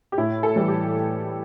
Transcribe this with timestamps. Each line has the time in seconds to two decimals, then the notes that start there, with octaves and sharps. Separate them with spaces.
0.12 G4
0.18 A2 E4
0.43 A4
0.56 E3 G3
0.68 G4